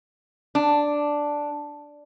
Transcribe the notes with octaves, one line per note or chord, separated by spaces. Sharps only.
D4